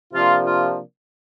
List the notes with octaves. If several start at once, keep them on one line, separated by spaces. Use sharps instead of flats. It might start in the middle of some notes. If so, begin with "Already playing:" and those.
C3 F3 A#3 D4 F4
F4